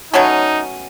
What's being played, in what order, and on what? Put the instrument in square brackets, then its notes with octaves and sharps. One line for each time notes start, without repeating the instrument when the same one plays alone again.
[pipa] B2 F#3 A3 C#4 [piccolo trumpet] D#4